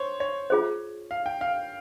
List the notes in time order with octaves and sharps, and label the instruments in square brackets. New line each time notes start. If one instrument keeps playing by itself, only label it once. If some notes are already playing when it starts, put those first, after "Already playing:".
Already playing: [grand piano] C5 C#5
C#5
[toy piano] F4 G#4 C5
[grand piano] F5
G5
F5